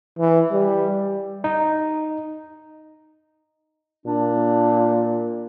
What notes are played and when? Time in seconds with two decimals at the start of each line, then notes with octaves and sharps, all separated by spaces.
0.19 E3
0.52 G3
1.44 D#4
4.06 A#2 D4